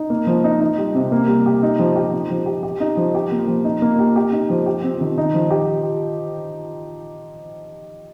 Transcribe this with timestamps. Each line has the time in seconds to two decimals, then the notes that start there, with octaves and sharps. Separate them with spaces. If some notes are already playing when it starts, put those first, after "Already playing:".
Already playing: D#4
0.10 A#3
0.27 F3
0.44 D#4
0.60 D#4
0.78 G3
0.95 C3
1.12 A#3
1.28 G3
1.46 G4
1.63 D#4
1.79 F3
1.96 G4
2.13 D#4
2.30 F3
2.46 G4
2.63 G4
2.80 D#4
2.97 F3
3.15 G4
3.32 A#3
3.48 F3
3.64 D#4
3.82 A#3
3.99 G4
4.16 G4
4.32 D#4
4.50 F3
4.66 G4
4.83 C4
5.01 D#3
5.18 D#4
5.34 F3
5.51 G4